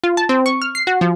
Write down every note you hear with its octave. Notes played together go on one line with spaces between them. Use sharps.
F4
A5
C4
C#6
F6
C7
F#4
F3